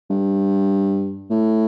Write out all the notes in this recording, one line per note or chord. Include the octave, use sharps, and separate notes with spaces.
G2
A2